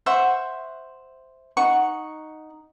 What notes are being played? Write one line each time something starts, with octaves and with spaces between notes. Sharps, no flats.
C5 E5 F#5 C#6
D#4 F#5 C#6